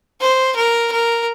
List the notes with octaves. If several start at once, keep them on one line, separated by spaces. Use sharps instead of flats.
C5
A#4
A#4